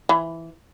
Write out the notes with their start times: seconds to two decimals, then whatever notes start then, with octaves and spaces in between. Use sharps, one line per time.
0.09 E3